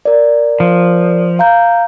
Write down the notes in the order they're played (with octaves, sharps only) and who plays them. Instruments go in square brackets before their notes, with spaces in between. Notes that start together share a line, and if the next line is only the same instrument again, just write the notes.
[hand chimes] A#4 D5
[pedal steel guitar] F3
[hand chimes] F5 A#5 G6